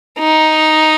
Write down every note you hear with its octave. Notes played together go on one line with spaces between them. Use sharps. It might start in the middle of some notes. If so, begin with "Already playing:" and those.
D#4